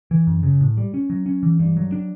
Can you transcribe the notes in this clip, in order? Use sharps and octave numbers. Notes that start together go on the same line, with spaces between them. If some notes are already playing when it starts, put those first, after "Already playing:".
E3
F#2
C#3
A2
G3
C#4
F#3
C#4
E3
G2
F#3
D4